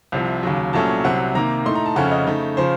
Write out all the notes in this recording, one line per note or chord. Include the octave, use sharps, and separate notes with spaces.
C2 C3 F3
D#2 C#3 F#3
C2 A#2 F#3 A3 C#4 A5
C2 C3 F#3 F#5
C3 D#3 A#3 A#5
A2 A3 D#4 C6
A#5
A5
F2 C#3 A3 C#4 F#5
D#5
C#3 A3 D#4
C#3 F3 C5